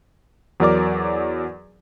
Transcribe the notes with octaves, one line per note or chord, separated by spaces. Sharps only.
E2 F#3 A#4 D5 D6